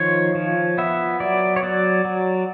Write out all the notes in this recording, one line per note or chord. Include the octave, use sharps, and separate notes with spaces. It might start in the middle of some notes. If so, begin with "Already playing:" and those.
Already playing: D#3 F3 C#5
F3
B3 E5
F#3 D5
C#5
F#3 D5
F#3